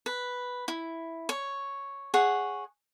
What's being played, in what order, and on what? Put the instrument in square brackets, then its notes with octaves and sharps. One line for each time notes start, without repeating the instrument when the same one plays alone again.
[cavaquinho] B4
E4
C#5
G#4 C#5 F#5